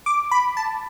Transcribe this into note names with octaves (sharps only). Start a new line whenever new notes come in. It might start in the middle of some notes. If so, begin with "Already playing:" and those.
D6
B5
A5